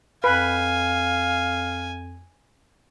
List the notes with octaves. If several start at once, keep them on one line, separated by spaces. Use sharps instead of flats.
F2 B4 F5 G#5